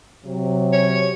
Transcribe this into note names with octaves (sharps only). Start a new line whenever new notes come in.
C3 F#3
C#5